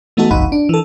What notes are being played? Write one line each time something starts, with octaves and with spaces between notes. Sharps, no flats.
E3 A3 B3 D#4 F#4 A4
G1 C2 F2 D#4 F#5 B5
D4
E3 A4